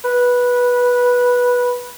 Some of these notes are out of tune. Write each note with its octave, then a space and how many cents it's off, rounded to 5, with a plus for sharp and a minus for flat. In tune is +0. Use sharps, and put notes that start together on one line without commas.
B4 -10